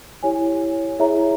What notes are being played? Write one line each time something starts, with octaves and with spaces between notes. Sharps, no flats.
E4 G4 C#5 G#5
E4 G#4 C#5 E5 A#5